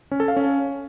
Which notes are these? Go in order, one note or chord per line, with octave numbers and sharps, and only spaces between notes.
C#4
A4
F5
C#4